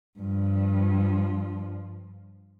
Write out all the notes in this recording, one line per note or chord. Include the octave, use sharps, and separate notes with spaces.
G2 F3